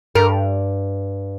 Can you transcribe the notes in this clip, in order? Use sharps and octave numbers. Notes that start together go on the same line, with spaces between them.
G2 A#4